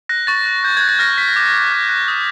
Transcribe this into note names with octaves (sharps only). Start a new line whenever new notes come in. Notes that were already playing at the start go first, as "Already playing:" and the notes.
F#6 A#6
C#6 A6
F#6
F#6 G6
F#6 G#6
A6
F6 A#6
F6 B6
D6
D6
F#6
F#6
D#6